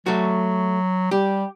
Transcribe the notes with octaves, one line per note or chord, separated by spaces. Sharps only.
F#3 A3 F#4
G3 G4